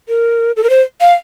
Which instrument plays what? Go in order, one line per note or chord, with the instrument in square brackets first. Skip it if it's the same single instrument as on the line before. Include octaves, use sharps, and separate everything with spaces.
[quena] A#4
A4
A#4
C5
F5